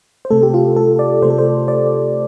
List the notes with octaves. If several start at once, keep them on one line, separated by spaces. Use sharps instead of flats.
C5
C3 A3 A4
G4
F4
A4
D5
C3 A3 C5
A4
C5
D5